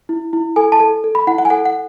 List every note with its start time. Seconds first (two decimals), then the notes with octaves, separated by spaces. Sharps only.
0.09 E4
0.33 E4
0.56 A4 G#5
0.72 A5
0.80 A4
1.04 A4
1.15 B5
1.27 E4 F#5
1.38 F#5
1.45 G#5
1.50 A4 F#5
1.65 F#5